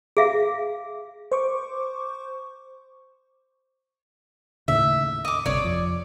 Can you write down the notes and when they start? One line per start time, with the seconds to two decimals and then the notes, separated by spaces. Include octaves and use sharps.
0.17 G#4 E5 F5
1.32 C5 C#6 D6
4.68 D#2 A2 C#3 E5
5.25 D#5 D6
5.46 G1 D2 C3 C#5 D5
5.64 F2